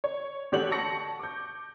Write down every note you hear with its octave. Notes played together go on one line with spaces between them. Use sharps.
C#5
A1 D3 G4 C#5 F#5 F#7
A5 C#6 A#6 C#7
D6 G6